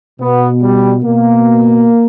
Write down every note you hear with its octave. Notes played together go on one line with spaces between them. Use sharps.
B2 B3
G3
B2 A#3